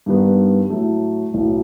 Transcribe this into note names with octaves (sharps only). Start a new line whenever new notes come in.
G2 D#3 G3 B3
A2 F#3 A3
B1 A2 F#3